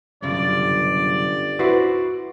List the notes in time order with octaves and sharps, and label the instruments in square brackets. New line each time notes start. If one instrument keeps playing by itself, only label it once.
[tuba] G1 [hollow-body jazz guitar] C2 F#2 C#3 [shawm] D5
[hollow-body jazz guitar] E4 B4 C5 [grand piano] F#4